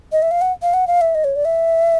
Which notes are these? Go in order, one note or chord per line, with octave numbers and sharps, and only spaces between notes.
D#5
E5
F5
F#5
F5
F#5
F5
E5
D#5
C#5
D5
E5